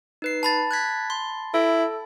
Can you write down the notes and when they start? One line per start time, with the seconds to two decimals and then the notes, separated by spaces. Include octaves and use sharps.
0.22 D#4 B4 C7
0.43 A5 B5 A6
0.71 F#6 G#6 B6
1.10 C6
1.54 E4 A4